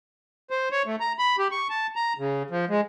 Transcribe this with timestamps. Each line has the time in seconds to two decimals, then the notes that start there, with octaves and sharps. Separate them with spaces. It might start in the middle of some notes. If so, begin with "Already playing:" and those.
0.50 C5
0.72 C#5
0.86 A3
1.00 A#5
1.19 B5
1.38 G4
1.52 C#6
1.70 A5
1.96 A#5
2.18 C#3
2.50 F3
2.69 G#3